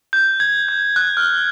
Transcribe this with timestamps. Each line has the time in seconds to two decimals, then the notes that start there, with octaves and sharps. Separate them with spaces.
0.13 G6
0.40 G#6
0.69 G6
0.96 F#6
1.17 F6